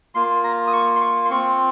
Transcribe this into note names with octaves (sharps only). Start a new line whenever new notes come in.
A#3 F4 C6
A#5
D#6
C#6
C6
C#6
C6
C4 F4 C#6